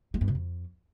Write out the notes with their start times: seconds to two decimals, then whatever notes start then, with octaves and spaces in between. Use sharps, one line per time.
0.14 G#3
0.21 G2
0.28 C3
0.35 F2